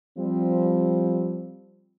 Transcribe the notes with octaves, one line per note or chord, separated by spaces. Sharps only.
F3 G3 C4